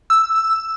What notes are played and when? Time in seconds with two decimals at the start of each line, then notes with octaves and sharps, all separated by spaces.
0.10 E6